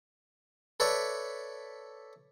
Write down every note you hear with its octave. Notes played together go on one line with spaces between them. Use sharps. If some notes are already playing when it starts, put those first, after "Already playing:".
A4 B4 C#5 D5 E5